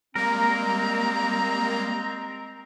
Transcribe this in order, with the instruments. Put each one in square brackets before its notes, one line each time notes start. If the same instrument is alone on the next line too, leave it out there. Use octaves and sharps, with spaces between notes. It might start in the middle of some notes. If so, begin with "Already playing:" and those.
[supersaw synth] G3 A#3 [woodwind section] G#3 C4 [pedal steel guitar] A#4 [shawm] A#5